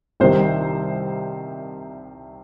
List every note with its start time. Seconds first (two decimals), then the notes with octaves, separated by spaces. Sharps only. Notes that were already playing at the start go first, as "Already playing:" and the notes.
0.20 C2 C3 D#3 C5